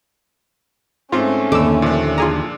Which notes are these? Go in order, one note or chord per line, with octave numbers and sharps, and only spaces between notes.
G#2 A3 C4 C#4 F4
D#2 D3 A4 D6 E6
A#2 F3 D4
F4 G#4 A#5